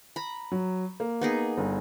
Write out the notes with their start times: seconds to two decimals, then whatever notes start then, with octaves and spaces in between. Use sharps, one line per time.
0.16 A#5 B5
0.52 F#3
1.00 A#3
1.21 B3 D#4 G#4
1.58 G1